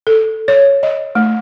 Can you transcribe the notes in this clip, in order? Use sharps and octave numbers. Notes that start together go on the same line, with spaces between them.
A4
C#5
D#5
A3